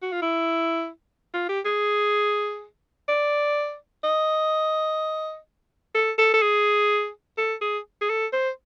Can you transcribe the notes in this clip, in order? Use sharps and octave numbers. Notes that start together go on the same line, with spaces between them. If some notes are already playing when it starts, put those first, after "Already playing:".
F#4
F4
E4
F4
G4
G#4
D5
D#5
A4
A4
A4
G#4
A4
G#4
G#4
A4
C5